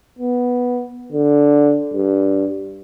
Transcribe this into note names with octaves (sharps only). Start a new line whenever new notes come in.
B3
D3
G2